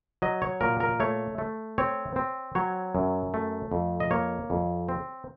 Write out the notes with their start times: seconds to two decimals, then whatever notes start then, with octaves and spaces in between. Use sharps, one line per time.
0.22 F#3 D#5
0.42 C#5
0.61 A#2 A#4
0.80 A#4
1.00 A3 C#5
1.38 A3
1.78 C4 C#5
2.16 C4
2.55 F#3 C#5
2.95 F#2
3.34 A3
3.72 F2
4.00 D#5
4.11 A#3 C#5
4.50 F2
4.89 C4